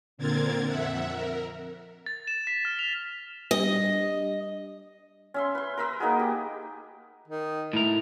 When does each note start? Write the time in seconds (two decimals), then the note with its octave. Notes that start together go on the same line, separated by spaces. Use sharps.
0.17 A#2 D3 C4 A#4 G#6 A6
0.66 F2 E5 F#5
1.12 A#4
2.06 A6
2.28 E7
2.47 B6
2.65 F6
2.79 F7
3.51 G3 D4 G4 D#5
5.34 C#4 E5 C6
5.55 B4 C6
5.78 A#4 B4 E5
6.00 A#3 D#4 F#4 G#4
6.19 G4
7.28 D#3
7.73 A2 A3 A#4